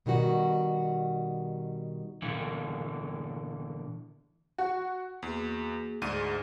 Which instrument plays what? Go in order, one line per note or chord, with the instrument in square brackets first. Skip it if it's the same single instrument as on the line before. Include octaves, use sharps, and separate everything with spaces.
[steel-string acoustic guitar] B2 D#3 G3 F#4
[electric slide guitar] A#2 D3 E3
[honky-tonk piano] F#4
[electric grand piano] E2 [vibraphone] A#3 F#4 G#4
[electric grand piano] D2 G#2 D#7 [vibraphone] G#4 D5